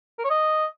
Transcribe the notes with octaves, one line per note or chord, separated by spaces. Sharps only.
A#4
C#5
D#5